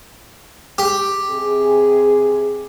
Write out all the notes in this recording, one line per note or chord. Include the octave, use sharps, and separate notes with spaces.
G4
C3 G#4